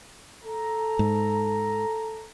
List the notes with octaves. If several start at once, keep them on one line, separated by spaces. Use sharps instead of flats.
A4 A#5
G#2